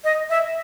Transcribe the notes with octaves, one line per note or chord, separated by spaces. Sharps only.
D#5
E5